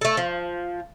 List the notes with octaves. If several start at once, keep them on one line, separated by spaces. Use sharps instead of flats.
A3 A4
F3